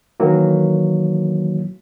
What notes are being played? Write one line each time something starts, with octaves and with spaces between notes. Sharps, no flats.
D#3 E3 F#3 A#3